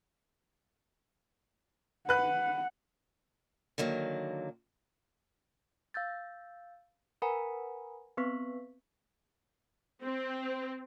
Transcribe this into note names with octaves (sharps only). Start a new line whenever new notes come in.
B4 F#5 F#6
D3 D#3 F#3 A#3
F5 E6 G6 A6
A#4 B4 F#5 G#5 A#5 B5
B3 C4 B4 C#6 B6
C4